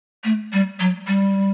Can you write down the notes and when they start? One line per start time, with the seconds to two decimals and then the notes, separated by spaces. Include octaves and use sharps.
0.24 A3
0.53 G3
0.80 F#3
1.07 G3